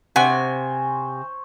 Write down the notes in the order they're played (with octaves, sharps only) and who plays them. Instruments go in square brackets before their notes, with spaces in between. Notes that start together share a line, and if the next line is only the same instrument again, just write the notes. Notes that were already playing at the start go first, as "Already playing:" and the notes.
[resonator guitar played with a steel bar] C3 [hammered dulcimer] C5 C#5 [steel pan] F#5 [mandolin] G#5